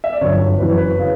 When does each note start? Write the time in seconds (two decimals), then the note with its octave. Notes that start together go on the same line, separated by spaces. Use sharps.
0.04 E5
0.13 D5
0.21 G1 F#2 D3 C#5
0.58 F#1 F#2 E3 B4
0.69 C#5
0.77 B4
0.99 C#3